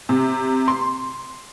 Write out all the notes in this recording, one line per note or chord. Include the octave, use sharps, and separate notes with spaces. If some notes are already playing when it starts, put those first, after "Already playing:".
C3
C6